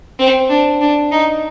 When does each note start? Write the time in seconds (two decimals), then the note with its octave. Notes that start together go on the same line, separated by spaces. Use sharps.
0.19 C4
0.50 D4
0.81 D4
1.12 D#4